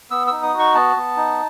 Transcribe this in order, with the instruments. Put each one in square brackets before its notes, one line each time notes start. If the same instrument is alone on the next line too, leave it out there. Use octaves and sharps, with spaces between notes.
[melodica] B3 E6
D#4 E6
D#6
F#4
C#6
B3 A5
B3
D#4